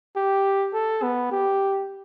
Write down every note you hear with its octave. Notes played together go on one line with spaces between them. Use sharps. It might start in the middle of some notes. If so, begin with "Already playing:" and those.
G4
A4
B3
G4